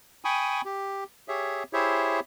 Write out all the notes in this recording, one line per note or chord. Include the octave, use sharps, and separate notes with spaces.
G5 G#5 B5 C#6 D#6
G4
G4 G#4 C#5 E5
E4 G4 G#4 C5 C#5 E5